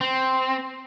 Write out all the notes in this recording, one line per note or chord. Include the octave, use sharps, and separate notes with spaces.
C4